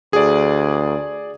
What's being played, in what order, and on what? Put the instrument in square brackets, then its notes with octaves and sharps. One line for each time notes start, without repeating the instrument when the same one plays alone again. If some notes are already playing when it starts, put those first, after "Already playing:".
[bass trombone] D2 [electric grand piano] G#4 D5